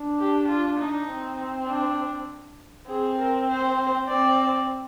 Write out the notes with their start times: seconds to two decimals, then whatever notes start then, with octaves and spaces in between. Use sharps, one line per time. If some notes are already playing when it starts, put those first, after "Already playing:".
Already playing: D4
0.19 G4
0.48 F4
0.79 D#4
1.09 C4
1.68 D4
2.88 C4 G#4
3.18 A#4
3.48 C5
4.08 C4 D5